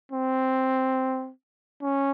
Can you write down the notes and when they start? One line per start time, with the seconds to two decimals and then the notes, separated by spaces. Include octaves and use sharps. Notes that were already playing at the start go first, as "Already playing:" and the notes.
0.12 C4
1.82 C#4